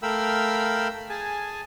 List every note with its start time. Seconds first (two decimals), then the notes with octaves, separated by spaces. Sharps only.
0.02 A3 A#4 F5 G5 B5 E6
1.10 G#4 G#5 A5